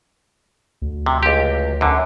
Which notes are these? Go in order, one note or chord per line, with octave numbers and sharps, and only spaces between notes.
D2
C3
C#2 G4
F#2 D3